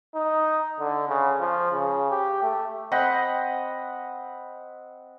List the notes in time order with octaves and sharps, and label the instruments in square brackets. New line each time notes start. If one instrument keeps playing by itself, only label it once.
[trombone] D#4
D3
C#3
F3
C#3
G4
A3
[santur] C4 D#5 F#5 B5